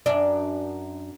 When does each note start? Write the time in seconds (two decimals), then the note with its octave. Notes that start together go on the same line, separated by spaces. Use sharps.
0.06 F#2 D4